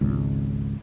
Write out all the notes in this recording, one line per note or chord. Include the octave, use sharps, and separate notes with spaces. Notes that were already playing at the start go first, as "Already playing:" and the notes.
G#1 C#2